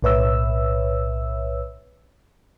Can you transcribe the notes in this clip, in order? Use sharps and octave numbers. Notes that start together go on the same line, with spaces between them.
B1 A2 B4 C#5 E5 E6